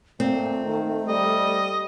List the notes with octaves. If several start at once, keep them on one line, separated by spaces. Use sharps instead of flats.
A#2 A3 C4
D#3
G3 D#5